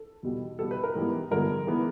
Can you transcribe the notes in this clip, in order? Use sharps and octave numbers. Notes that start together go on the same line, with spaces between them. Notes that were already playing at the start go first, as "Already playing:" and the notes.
Already playing: A4
E2 B2 G3 B3
B2 G3 B3 A4
B4
A#4
G#2 E3 G3 B3
G2 D3 F3 G#3 B3 A#4
E3 G#3 B3